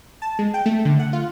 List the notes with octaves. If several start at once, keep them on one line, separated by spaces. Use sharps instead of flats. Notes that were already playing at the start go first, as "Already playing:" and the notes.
A5
G#3
G5
A3
D3
F#5
F4